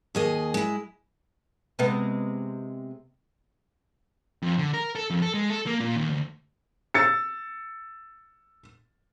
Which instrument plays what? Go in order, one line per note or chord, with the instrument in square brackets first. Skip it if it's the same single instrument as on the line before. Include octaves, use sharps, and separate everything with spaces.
[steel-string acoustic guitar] D#2 G#4 D#5
G#3 E4
[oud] C3 G#3 B3
[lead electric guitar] F2
D3
A#4
A4
F2
A4
G#3
A4
A#3
A#2
D#2
D2
[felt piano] E6 A6 C#7